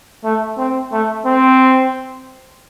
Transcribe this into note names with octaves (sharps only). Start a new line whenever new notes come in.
A3
C4
A3
C4